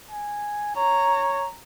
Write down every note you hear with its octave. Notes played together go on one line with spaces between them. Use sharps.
G#5
C#5 A#5